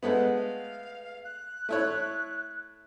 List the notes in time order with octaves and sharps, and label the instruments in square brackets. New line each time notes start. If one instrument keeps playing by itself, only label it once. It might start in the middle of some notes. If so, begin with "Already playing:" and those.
[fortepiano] G#3 A3 B3 [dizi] F#5
[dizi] F5
F#6
[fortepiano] A3 E4 C#5